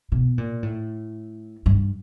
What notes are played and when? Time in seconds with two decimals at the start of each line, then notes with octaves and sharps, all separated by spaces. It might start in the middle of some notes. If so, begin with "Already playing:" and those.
0.12 B2
0.38 A#2
0.63 A2
1.66 G2